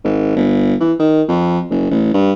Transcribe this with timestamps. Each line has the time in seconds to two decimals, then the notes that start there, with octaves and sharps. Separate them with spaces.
0.04 G#1
0.36 G1
0.80 E3
0.99 D#3
1.28 F2
1.70 F#1
1.91 A1
2.14 G2